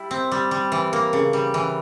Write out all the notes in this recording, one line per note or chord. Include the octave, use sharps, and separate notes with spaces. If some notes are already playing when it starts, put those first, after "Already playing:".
Already playing: G3 E4
C4
G3
G3
E3
A#3
C#3
G3
E3